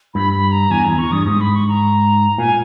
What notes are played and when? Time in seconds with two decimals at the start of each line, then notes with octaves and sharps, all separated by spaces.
0.14 G2 B5
0.33 B5
0.52 A#5
0.70 E2 G#5
0.84 E2 A#5
0.98 E2 C#6
1.12 G2 D#6
1.26 G#2 D#6
1.41 B5
1.54 C#6
1.69 A#5
2.38 A#2 G#5